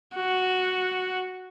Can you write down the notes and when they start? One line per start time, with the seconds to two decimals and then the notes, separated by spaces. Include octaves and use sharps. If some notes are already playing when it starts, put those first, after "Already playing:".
0.15 F#4